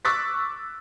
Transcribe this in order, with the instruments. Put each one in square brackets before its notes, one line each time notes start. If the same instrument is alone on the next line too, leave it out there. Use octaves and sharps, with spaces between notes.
[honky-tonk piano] C#6 D6 E6 F#6 A6 B6